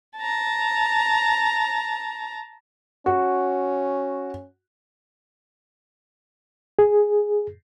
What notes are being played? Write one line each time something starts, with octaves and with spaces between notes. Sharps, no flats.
A5 A#5
C#4 F#4
G#4